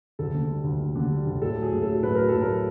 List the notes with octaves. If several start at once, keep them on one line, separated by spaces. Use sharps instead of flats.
D2 A4
D3
G3
D2
D2
D3
G3
D2
A2 A4
F#3
G#4
A2
A4
F#3
A2 B4
F#3 A#4
A2 A4
A#4
F#3